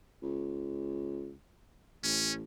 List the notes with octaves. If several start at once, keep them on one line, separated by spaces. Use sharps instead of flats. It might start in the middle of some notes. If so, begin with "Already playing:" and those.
C#2
A1 C#4